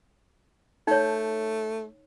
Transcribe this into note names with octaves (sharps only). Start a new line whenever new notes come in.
A3 D#4 C#5